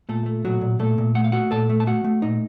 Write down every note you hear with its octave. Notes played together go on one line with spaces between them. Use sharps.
A#2 A3 A4
A3
A#2 F#3 F#4
A#2
A#2 A3 A4
A#2
A3 F#5
F5
A3 F#4 F#5
A#2 A4 A5
A3
A5
A3 F#4 F#5
A3
A#2 D#4 D#5